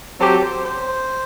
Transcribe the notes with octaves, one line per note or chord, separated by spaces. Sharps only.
F#3 C4 G4 A4
C5
C5